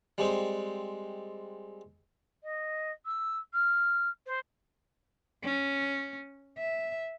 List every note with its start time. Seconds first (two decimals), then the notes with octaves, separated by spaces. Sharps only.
0.18 G3 G#3 C4
2.43 D#5
3.05 E6
3.53 F6
4.26 C5
5.44 C#4
6.58 E5